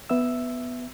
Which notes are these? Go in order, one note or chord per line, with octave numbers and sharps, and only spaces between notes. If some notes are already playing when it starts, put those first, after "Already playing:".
B3 E5 E6